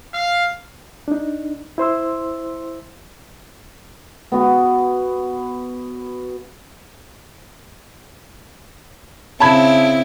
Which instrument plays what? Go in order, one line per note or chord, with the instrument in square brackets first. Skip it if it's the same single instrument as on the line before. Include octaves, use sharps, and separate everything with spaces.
[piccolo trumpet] F5
[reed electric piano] D4 D#4
E4 C5 C6 E6
[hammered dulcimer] B3 F#4
[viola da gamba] C#3 C4 E4 [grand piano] A5 B5 G#6